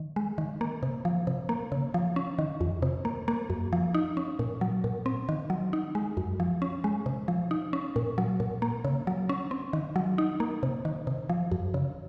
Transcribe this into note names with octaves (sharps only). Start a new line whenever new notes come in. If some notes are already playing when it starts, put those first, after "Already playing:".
Already playing: D#3
G#3
D#3
A#3
C3
F3
C3
A#3
C#3
F3
C#4
D#3
F2
C3
A#3
A#3
F#2
F3
D#4
C#4
A#2
F#3
A#2
C4
D#3
F#3
D#4
G#3
F#2
F3
C#4
G#3
C3
F3
D#4
C#4
A#2
F#3
A#2
A#3
C#3
F#3
C#4
C4
D#3
F#3
D#4
A#3
C3
D#3
C3
F3
F#2
C#3